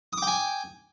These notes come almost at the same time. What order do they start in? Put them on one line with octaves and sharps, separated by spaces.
D#6 D6 G5 G#5